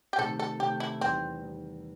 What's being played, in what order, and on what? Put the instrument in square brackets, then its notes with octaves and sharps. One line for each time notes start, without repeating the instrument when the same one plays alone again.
[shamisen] G4
[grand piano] C3 D#3 A3 [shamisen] A4
[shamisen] A4
[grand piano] C3 D#3 A3 [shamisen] G4
[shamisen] E4
[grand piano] E2 D#3 G3 [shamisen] C4
[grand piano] E2 D#3 G3